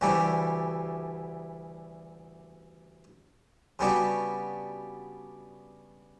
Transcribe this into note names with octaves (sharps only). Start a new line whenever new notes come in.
D2 C#3 E3 G3 D4
C#3 G3 B3 D4 F#4